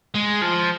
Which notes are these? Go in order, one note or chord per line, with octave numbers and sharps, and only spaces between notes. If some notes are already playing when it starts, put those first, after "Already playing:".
G#3
F3